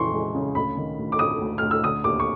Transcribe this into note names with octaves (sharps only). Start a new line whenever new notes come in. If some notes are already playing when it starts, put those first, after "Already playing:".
Already playing: F2 C#3 E3 G#3 C6 C#6
G#3
C#3
D2 B5
D#3
D2
D6
D2 D#6
D2
D2 F6
E6
D3 D#6
D#2 D6
C#6